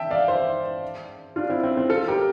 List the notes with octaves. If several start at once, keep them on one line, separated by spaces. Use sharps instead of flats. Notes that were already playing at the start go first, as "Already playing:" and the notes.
Already playing: E5 G5 A5
D5 F5
C5 E5
D4 F4
C4 E4
C4
C4
F4 A4
G4 A#4